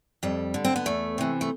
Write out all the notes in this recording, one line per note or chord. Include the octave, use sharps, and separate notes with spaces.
F2 G3
D3
C4
B3
E2 A3
C3 E3
A3